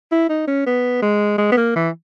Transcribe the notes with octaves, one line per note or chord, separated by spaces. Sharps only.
E4
D#4
C#4
B3
G#3
G#3
B3
A#3
E3